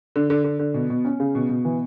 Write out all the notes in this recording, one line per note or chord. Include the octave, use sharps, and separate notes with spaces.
D3
D3
D3
D3
B2
B2
C#4
C#3
B2
B2
E3